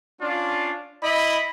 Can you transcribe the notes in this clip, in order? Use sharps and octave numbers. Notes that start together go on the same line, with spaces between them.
C#4 D4 F4
E4 D#5 B5